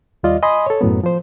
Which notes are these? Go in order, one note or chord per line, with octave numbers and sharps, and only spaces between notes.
D#2 G3 F4 D5 D#5
D#5 G#5 B5 C6 D#6
A4 C#5
F#2 A2 F#3 B3
F3 C5